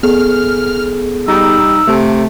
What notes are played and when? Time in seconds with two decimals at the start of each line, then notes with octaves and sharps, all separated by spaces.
0.03 B3 G#4 A4 F6
1.28 G3 D#4 E6
1.87 C3 A3